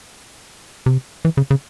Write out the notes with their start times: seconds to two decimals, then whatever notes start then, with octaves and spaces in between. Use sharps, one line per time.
0.86 C3
1.25 E3
1.37 C#3
1.51 C#3